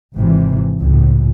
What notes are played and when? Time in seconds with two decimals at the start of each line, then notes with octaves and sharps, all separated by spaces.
0.16 G#1 C3 E3
0.79 C#2 A2